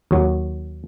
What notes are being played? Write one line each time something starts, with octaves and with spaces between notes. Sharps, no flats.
D#2 F#3